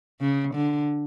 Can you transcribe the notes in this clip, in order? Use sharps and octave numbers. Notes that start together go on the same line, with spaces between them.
C#3
D3